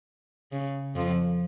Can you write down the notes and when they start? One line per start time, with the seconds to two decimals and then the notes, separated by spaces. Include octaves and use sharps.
0.52 C#3
0.96 F2 F3